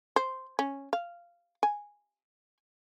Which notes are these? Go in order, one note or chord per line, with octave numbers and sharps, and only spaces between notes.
C5
C#4
F5
G#5